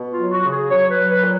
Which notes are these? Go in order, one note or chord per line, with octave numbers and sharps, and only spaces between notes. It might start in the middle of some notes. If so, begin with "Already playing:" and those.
Already playing: B2
F4
F#3
F#4
C#3
G#4
F#3 C#5
B4
F#3
B4
A#2